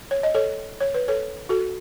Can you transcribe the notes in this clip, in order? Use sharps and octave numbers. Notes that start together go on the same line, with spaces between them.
C#5
D#5
A4 C#5
C#5
B4
A4 C#5
F#4 A4